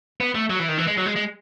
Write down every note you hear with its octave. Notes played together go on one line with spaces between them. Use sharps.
B3
A3
F#3
E3
D#3
E3
G#3
F#3
G#3
G#3